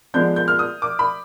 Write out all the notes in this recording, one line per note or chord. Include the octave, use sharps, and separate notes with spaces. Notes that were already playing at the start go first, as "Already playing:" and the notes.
D3 F3 G#3 B3 D4 G6
G6
F6
D#6
D6
B5